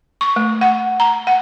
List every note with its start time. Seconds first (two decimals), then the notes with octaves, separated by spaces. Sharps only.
0.21 C#6
0.36 A3
0.61 F#5
1.00 A#5
1.27 F#5